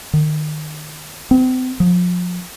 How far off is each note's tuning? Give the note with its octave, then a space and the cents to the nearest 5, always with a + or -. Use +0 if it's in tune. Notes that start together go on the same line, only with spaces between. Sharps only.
D#3 -30
C4 -35
F3 +35